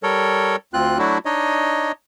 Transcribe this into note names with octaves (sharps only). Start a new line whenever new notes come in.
G3 A4 A#4 C#5
D2 C4 F4 F#6
F#3 A3 D4 E4 F#4
D4 D#4 C#5 D#5